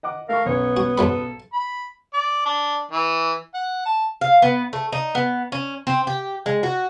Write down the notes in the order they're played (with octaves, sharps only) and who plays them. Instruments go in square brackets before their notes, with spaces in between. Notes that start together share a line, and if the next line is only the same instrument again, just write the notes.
[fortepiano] D#5 F#5 D6
[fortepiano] A3 C#6 [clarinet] A#4 [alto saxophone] F5
[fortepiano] B1 C#4 [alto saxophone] B3 [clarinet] C#5
[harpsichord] F#4
[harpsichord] G#2 F#3 B5 [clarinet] A4
[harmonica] B5
D5
D4
E3
F#5
A5
[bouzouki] F5
B3
A3
D#4
B3
C#4
C4
G4
G#3
F#4